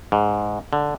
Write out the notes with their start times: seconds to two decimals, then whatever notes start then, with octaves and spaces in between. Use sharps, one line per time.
0.12 G#2
0.73 D3